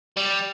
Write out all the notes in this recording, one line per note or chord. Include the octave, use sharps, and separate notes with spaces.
G3